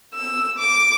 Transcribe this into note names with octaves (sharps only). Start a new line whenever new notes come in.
E6
D6